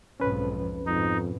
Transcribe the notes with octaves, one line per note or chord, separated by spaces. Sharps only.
B1 F2 G#2 C#4 B4
F2 G#2 B2 D#4